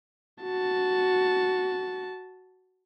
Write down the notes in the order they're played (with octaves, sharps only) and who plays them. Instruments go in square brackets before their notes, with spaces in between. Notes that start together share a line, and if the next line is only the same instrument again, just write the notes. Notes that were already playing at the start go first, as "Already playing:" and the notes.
[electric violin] F#4 A5